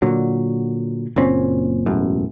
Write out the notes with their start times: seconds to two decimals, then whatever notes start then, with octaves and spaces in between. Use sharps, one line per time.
0.02 A#2 D3 F#3
1.16 F#1 A#2 C4 C#4
1.86 E1 A1 F#2